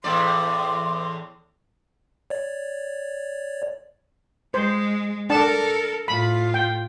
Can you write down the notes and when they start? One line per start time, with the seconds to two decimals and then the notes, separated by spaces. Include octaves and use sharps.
0.04 E2 A2 D5 C6
2.30 C#5 D5
4.54 G#3 C5
5.30 D4 A4 A#4 A5
6.08 A2 F4 B5
6.54 G5